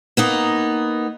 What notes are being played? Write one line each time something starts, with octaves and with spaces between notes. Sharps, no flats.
A#3 B3 D#4